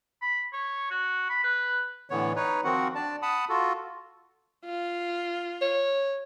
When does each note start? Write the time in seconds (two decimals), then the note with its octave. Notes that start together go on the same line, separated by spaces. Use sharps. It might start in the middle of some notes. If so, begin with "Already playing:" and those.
0.21 B5
0.53 C#5
0.90 F#4
1.29 B5
1.43 B4
2.09 A2 D3 E3 B3 C#5
2.36 D#4 B4 C#5
2.64 D#3 F3 C4 F#4 F#5
2.95 D4 D5 A5
3.22 F#5 A5 B5 D#6
3.49 F4 F#4 A4
4.65 F4
5.62 C#5